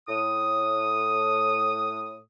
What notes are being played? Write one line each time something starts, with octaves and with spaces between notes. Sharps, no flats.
A2 D#6